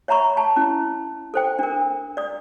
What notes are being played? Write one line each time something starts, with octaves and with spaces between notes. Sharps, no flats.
C#5 E5 A#5 B5 C#6
A5
C#4 E4
A4 C5 G5
D4 A#4
D5 D#6